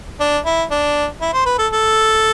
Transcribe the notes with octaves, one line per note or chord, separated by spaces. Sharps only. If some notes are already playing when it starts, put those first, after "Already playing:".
D4
E4
D4
E4
C5
B4
A4
A4